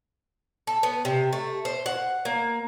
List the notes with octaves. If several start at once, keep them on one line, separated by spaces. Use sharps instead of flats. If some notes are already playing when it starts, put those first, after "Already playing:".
A4
B3
C3
A3
C5
F#5
A#3